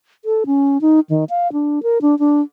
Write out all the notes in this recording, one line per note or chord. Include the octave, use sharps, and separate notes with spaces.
A4
C#4
D#4
D#3
F5
D4
A#4
D4
D4